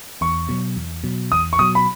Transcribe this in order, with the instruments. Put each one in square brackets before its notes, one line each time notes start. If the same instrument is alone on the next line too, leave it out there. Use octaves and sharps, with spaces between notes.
[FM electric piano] E2 [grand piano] C#6
[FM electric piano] B2 F#3
E2
B2 F#3
[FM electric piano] E2 [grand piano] D#6
[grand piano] C#6
[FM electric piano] B2 F#3 [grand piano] D#6
[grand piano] B5